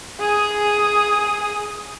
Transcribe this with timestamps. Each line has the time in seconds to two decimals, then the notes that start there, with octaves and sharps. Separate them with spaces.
0.19 G#4 D#6